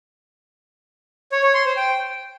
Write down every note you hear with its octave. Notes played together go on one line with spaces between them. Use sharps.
C#5
C#5
C6
C5
G5